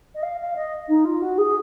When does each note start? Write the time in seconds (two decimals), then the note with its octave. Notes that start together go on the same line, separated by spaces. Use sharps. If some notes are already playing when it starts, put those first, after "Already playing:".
0.15 D#5
0.22 F5
0.39 F5
0.55 D#5
0.88 D#4
1.05 F4
1.21 F#4
1.38 G#4